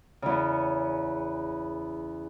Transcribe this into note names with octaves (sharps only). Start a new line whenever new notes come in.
E2 C#3